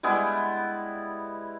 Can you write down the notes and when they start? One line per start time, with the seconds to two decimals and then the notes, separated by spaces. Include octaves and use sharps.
0.03 G3 G#3 B3 E4